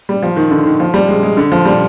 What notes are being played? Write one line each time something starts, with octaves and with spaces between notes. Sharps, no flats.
G3
F3
D#3
D3
D#3
F3
G3
G#3
G#3
D3
F3
G3